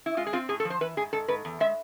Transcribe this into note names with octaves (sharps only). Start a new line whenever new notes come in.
E4
G#3 F4
G#4
C4 F4
A2 G#4
A4
F3
C5
E3 B4
G#2 G#4
G#2 A4
G#2 B4
E2
G#3 E5